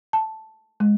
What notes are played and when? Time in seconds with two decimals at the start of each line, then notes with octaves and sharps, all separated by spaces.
0.13 A5
0.80 G#3